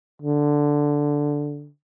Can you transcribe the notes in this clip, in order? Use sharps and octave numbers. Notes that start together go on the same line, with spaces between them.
D3